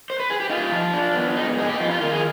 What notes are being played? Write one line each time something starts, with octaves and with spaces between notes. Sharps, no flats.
C5
B4
G#4
G4
D#4 F4
F3
D4
B3
G#2 D#4
D#4 G#4
G4
F2 F4
F4
D#3 F4
G#4